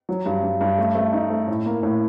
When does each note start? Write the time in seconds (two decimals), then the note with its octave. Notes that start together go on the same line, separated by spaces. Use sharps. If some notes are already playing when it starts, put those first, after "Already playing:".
0.09 F#3
0.26 G2
0.43 G2
0.61 G2
0.78 A3
0.95 A3
1.13 D#4
1.30 A3
1.48 A2
1.66 A#3
1.83 A2